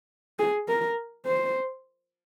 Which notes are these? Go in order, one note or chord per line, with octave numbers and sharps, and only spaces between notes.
G#4
A#4
C5